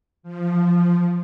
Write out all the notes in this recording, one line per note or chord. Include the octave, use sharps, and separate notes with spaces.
F3